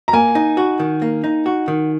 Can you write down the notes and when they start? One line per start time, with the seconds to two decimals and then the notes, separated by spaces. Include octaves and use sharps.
0.08 A#5
0.13 A#3 G#5
0.35 D#4
0.57 F#4
0.80 D#3
1.02 A#3
1.24 D#4
1.46 F#4
1.68 D#3